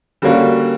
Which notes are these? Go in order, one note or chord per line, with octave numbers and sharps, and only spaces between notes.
D3 G3 A#3 C#4 F#4